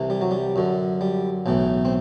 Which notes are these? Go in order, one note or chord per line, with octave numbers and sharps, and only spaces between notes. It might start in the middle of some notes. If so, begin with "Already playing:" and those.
Already playing: C2 C3 E3
G3
F#3
G3
F#2 D3
G3
B1 A2 E3
C4